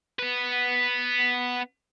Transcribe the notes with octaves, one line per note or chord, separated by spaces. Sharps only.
B3 B4